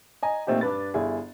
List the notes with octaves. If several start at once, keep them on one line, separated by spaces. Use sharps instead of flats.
D#5 G#5 A#5
A#2 A3 C4 D#4 G4
G2 D4 B4 A6
G1 E4 G#4